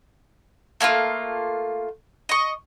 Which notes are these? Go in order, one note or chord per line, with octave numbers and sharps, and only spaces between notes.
A3 A#3 E4 F4
D#5 C#6